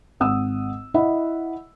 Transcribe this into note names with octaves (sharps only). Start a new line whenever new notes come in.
G#1 F#5 D#6 E6
E4 D#5 E5 F#5 B5